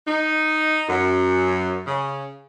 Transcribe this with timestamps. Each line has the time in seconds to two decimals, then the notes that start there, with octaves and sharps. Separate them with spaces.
0.07 D#4
0.89 F#2
1.87 C#3